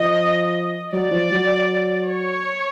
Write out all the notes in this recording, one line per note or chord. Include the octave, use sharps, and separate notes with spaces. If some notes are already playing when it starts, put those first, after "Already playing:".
Already playing: F3 D#5
F#3 D5
F3
F#3
C#5